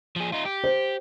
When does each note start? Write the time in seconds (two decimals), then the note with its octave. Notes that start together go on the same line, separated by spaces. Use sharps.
0.16 F3 G#4
0.33 D#4 F4
0.45 G4
0.64 C5